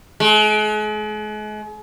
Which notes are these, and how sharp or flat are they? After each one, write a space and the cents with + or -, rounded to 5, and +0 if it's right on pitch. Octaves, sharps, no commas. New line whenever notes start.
G#3 +40